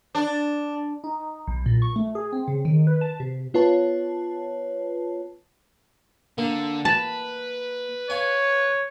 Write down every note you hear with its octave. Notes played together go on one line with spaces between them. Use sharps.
D4
D#4
B1
A#2
C#6
A3
G#4
C4
C#3
D#3
B4
A5
C3
B3 F4 B4 C#5 A5
D3 A#3
B4 A5
C#5 F5 G#5